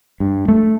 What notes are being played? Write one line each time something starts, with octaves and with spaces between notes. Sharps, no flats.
G2
A3